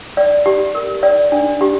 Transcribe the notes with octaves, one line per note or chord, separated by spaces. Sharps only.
D5
G4
A#4
D5
D4
G4